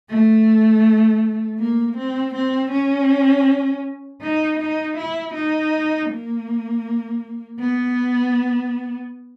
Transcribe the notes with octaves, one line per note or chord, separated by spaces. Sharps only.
A3
A#3
C4
C4
C#4
D#4
D#4
E4
D#4
A#3
B3